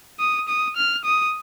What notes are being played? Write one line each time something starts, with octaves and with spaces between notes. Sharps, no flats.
D#6
D#6
F6
D#6